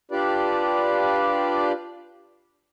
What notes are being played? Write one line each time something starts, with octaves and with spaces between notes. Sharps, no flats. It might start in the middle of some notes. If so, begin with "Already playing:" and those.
D4 F4 G4 B4 D5